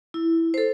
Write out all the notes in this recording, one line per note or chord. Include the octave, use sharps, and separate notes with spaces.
E4
A4 C5